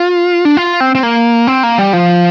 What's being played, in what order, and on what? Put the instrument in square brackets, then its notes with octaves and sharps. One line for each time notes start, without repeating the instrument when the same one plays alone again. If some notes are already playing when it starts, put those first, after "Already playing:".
Already playing: [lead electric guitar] F4
D4
F4
C4
C4
A#3
C4
A#3
G3
F3